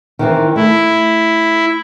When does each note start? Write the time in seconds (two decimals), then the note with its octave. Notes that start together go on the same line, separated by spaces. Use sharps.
0.19 D#3 E3 C4
0.56 A3 E4